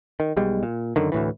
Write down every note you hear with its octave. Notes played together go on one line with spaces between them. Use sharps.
D#3
B1 B2 G3 G#3
A#2
F#2 D3 D#3
D2 A2 E3